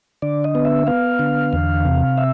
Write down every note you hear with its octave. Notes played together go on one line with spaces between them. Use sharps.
D3 D5
D#5
B3
E5
B3 F5
D3
E2
C3
E5